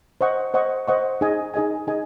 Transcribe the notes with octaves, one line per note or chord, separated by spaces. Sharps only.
C5 D#5 F#5 C#6
C5 D#5 F#5 C#6
C5 D#5 F#5 C#6
D#4 G#4 D#5 G#5
D#4 G#4 D#5 G#5
D#4 G#4 D#5 G#5